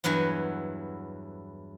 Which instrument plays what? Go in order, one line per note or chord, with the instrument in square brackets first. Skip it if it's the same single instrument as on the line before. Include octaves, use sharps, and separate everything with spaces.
[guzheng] E2 G2 F#3 E4 G#5